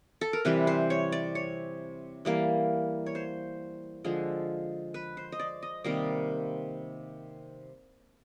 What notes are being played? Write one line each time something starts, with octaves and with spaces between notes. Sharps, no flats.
A4
A#4
C3 E3 G3 B4
C5
C#5
D5
C#5
E3 G3 A#3
C#5
C5
D3 F3 G#3
B4
C5
D#5
D5
D#5
C3 D#3 G3 A#3 D#5